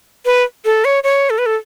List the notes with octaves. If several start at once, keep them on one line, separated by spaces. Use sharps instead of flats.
B4
A4
C#5
C#5
A4
B4
A4